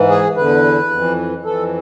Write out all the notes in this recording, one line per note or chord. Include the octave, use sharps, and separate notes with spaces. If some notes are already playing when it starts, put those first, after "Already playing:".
Already playing: G#2 E3
G#4
E2 D3 B4
F2 E3
F2 E3 A4